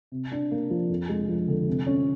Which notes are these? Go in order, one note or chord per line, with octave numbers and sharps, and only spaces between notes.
C3
D4
A#3
F3
F2
G#3
F3
D3
C3
C#4